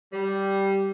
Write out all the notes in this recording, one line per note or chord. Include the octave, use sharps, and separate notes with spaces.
G3